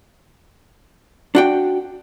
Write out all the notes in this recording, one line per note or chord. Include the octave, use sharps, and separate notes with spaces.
D4 F#4 G5